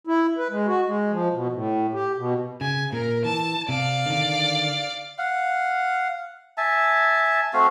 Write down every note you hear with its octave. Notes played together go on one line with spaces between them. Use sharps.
E4
B4
G#3
F#4
G#3
F3
B2
A2
G4
B2
C#3 G#5
A#2 A#4
E3 A5
C3 D5 F5
D3 D#3
F5 F#5
E5 G#5 A5
A3 C4 F#4 F5